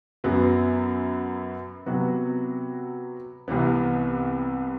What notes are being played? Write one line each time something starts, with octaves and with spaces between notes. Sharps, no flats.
F#2 F#3 B3
C3 F#3 B3 F#4
C2 C3 E3 B3